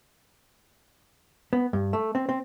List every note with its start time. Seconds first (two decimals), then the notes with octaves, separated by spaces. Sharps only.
1.53 B3
1.73 G2
1.93 A3
2.15 C4
2.29 C4